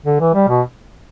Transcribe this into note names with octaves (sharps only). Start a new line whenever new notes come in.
D3
E3
G3
B2